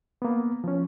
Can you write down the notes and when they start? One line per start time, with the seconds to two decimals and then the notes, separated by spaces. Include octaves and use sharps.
0.22 A#3 B3
0.64 F3 C#4